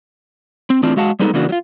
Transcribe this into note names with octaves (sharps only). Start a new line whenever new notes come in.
C4
A2 E3 C4 D4 F4
G#3 F#4 F5 F#5 A5
G3 G#3 B3 D#4 A4
C#3 E3 A#3 D4 F#4
F#3 F4